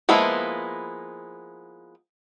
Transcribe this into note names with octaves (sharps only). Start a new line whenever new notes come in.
F3 G#3 A#3 B3 E4